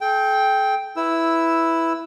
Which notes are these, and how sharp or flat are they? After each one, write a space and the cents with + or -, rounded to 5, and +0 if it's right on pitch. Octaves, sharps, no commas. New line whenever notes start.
A4 -45 G5 +0
E4 +0 B4 +0 E6 -5